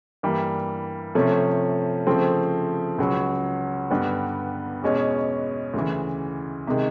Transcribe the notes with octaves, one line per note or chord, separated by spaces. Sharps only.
G2 E3 G3 A#3
C3 F3 A3 C#4
C#3 F3 A3 C4
C#2 C#3 F#3
G2 D3 G3 B3
E2 B2 G#3 C#4
D2 C#3 E3
C3 D#3 G#3